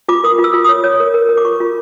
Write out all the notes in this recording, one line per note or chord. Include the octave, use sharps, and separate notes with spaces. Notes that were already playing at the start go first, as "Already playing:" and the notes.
F4 D6
A#4 D#6
F4
E6
F4
C#5 D#6
C#5
A#4
A#4
A#4
D6
F4 C#6
F4